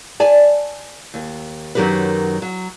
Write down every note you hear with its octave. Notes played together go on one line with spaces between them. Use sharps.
D5 G#5 A5
D#2
F#2 D#3 F#3 G4 A#4 B4
F#3